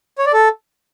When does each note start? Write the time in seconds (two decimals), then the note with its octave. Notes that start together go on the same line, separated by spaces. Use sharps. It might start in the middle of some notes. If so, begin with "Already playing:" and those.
0.18 C#5
0.26 D5
0.33 A4